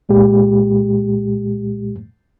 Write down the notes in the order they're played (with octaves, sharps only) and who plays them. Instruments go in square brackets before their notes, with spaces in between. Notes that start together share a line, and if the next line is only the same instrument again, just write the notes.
[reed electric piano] C2 A#2 G#3 G4